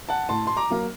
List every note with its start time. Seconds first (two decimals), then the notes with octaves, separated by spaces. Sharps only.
0.09 F#5 A5
0.29 A2 A5 C6
0.47 C6
0.57 A#5 D6
0.70 F#3 A#3